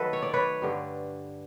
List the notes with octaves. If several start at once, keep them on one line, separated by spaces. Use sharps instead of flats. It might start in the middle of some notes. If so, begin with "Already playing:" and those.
Already playing: D#3 F#3 A3 A4 B4 D#5
C#5
D5
B4 C#5
G2 D3 G3